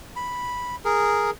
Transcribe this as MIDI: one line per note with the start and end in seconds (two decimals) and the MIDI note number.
0.16 0.76 83
0.85 1.31 68
0.85 1.31 70